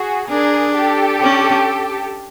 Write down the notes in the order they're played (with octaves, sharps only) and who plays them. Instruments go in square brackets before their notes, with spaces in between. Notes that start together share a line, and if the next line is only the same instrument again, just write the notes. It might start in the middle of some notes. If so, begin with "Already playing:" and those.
Already playing: [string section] F#4 G#4
[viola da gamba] D4 [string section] G#4 A#4
[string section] G4 A4
[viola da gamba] C#4